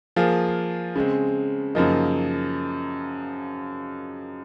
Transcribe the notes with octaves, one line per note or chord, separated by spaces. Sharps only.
F3 A#3 F4 G#4
C#3 G#3 C4
F#2 C#3 F3 A#3 D#4